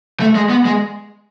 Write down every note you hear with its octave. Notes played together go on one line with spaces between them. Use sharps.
A3
G#3
B3
G#3